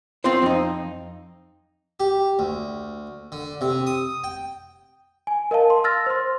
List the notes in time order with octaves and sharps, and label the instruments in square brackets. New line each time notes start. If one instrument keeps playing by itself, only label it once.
[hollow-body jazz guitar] C4 F4 C5
F2 D#4
[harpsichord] G4
D2
D3
C3
D#6
G5
[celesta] G#5
A#4 D#5 F5 A5
C6
E6 F6 A6 A#6
C5 C6